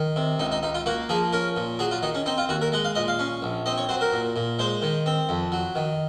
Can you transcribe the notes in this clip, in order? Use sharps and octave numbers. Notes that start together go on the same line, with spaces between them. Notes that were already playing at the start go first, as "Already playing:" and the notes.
Already playing: D#3
C3
C#2 D#4
D#4
C#2 D#4
F4
A#3 F#4
F3 G#4
C#4 A#4
A#2
F#3 G#4
F4
D#3 D#4
C#4
C4 D#4
F4
D#2 F#4
A#4
G#3 F#5
F5
A#2 D#5
F5
C#4
A#1
C4 D#5
C#5
F#3 C5
A#4
A#2
A#2
G#3 C5
D#3
C4
F2
F#3
D#3